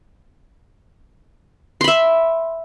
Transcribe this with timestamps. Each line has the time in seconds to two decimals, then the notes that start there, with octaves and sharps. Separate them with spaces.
1.81 C6
1.84 B5
1.88 E5